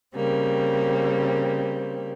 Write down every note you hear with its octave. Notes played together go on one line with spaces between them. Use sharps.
C#3 G3 A#3 C4